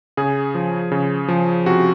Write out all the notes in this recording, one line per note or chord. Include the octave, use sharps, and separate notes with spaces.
C#3 G#4
F3
C#3
F3
C3 F#4